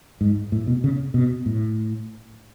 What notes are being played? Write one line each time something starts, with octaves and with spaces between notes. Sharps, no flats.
G#2
A2
B2
C#3
B2
A2